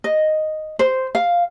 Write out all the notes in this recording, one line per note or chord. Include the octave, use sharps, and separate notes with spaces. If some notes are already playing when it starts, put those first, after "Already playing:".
D#5
C5
F5